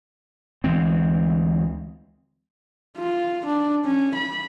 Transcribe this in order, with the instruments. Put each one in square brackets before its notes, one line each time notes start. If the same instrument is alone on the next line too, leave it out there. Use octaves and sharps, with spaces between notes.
[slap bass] D2 E3 G#3 C4
[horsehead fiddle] F4
D4
C#4
B5